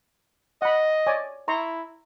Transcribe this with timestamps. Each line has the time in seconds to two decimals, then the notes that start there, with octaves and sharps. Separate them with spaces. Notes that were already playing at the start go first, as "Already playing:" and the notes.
0.62 D#5 F#5 B5
1.07 C#5 D5 G#5
1.48 E4 A#5 C6 C#6